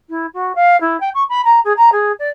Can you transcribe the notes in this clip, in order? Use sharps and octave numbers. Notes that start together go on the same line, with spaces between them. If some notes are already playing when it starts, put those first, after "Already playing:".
E4
F#4
F5
E4
G5
C#6
B5
A#5
G#4
A#5
G#4
D5